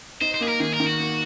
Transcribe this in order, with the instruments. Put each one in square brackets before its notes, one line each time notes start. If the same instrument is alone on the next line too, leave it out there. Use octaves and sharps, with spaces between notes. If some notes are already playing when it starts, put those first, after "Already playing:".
[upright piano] D#4 [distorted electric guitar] C5
[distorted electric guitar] C5
[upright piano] A#3 [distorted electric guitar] G#4
[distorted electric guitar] A#4
[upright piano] D#3 [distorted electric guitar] G#4
[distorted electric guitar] A#4
[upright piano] D#3
[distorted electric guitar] F#4
[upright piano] A#3